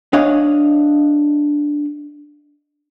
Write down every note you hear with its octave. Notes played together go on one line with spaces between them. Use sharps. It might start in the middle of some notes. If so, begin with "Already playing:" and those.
D4 C#5 D#5 F5